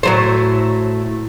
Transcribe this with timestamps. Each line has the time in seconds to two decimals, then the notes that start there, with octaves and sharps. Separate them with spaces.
0.03 A2 F#3 C5